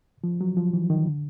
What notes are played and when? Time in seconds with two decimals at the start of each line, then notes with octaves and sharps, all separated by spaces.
0.24 F3
0.41 F#3
0.57 F3
0.73 E3
0.90 D#3
1.06 D3